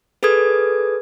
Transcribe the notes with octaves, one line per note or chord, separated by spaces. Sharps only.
G#4 A4 B4 D#6 G#6